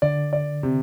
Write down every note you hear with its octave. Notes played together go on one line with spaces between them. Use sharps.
D3 D5
D5
C3